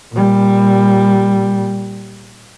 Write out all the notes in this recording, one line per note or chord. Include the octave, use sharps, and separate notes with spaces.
A#2 G3